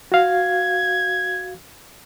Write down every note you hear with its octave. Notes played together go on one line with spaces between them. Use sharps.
F#4 F5 G#6